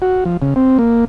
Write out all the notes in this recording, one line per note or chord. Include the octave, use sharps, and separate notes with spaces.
F#4
F3
C#3
C4
A#3